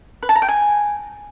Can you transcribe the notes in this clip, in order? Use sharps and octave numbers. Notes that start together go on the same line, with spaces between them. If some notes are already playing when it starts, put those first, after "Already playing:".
B4
A5
A#5
G5
G#5